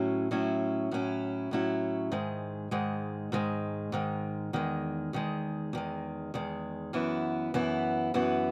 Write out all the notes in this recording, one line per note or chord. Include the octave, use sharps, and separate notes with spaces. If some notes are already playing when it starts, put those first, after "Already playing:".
Already playing: A2 F#3 C#4 E4
A2 F#3 C#4 E4
A2 F#3 C#4 E4
A2 F#3 C#4 E4
G#2 D#3 G#3
G#2 D#3 G#3
G#2 D#3 G#3
G#2 D#3 G#3
E2 D#3 G#3
E2 D#3 G#3
E2 D#3 G#3
E2 D#3 G#3
F#2 E3 B3 E4
F#2 E3 B3 E4
F#2 E3 B3 E4